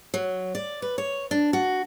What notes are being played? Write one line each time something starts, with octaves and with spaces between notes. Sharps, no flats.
F#3
D5
B4
C#5
D4
F#4